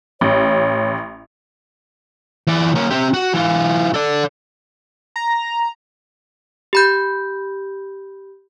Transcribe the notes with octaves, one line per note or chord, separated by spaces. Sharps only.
A1 C#5
E3 D5
A#3 C#4
C4 G4
F#4
E3 F4
A4 D5
A#5
G4 B5 G6